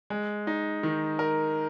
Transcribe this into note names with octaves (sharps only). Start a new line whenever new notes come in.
G#3
D#4
D#3
A#4